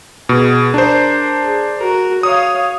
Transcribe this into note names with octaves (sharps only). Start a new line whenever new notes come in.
B2 G#4
D4 A#4 C5
G#4
F#4 A#4
C#5 F5 D#6